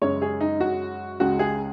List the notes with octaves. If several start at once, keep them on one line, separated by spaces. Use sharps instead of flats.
F#2 C#3 G#3 C#5
G#4
D#4
F#4
C#2 C#3 G#3 F#4
G#4